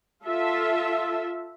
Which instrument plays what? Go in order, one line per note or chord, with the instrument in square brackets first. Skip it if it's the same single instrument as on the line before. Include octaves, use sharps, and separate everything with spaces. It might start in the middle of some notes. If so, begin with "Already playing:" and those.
[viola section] F4 A4 E5